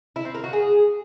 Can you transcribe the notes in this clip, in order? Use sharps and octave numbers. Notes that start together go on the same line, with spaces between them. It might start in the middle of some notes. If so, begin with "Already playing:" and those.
E4
C4
A#4
F#4
G#4